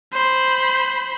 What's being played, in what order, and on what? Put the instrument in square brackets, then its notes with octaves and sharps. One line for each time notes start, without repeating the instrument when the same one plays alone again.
[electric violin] C5 B5